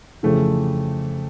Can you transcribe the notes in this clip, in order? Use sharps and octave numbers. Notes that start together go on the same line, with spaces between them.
F2 C#3 E3 A3